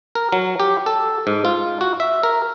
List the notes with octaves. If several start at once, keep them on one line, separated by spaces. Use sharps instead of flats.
A#4
F#3
G4
A4
G#2
F4
F#4
E5
A#4